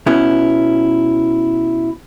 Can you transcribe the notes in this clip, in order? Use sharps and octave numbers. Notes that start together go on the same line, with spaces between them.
B2 B3 C#4 E4